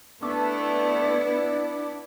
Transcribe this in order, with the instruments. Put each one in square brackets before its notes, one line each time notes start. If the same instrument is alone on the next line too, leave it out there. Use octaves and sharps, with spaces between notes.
[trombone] A3 [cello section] B3 E4 [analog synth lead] D4